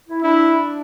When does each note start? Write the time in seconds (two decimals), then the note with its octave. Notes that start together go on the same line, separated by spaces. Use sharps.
0.08 E4
0.23 D4 E4